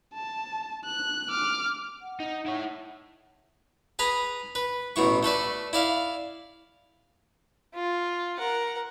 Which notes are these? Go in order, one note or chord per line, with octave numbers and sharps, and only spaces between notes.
A5
F#6
D6 F6
F#5
D#4
E4 C#5
G#4 B4 A#5 B5
B4
A1 B2 E3 C#6
A3 A4 B4 D5
E4 D5 F5
F4
A#4 F#5